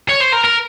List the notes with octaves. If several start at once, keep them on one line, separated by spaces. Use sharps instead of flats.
C#5
C5
A#4
A#4